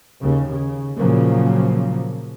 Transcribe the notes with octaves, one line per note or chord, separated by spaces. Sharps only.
D#2 C#3
C#3
A#2 C#3 F3 F#3 A#3